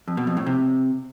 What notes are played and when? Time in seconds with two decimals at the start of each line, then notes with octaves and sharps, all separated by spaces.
0.08 F2
0.17 B2
0.27 F2
0.37 A2
0.46 C3